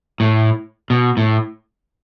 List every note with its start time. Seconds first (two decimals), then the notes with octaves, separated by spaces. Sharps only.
0.20 A2
0.90 B2
1.17 A2